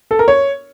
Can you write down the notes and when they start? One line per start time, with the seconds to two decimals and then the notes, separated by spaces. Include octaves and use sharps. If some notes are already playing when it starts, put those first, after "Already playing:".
0.11 A4
0.19 A#4
0.28 C#5